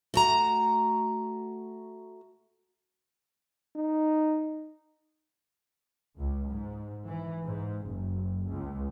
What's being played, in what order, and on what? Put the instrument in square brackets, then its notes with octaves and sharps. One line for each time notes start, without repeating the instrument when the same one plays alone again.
[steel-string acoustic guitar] A3 F#4 A#5
[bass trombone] D#4
[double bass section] C#2
G#2
E3
G#2
F#1
C#2